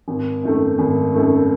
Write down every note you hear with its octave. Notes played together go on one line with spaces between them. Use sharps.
G#1
F#2 D#3 A3
G#1
F#2 D#3 A3